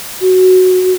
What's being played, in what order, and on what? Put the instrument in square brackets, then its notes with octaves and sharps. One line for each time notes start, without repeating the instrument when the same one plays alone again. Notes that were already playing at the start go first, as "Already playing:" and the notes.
[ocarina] F#4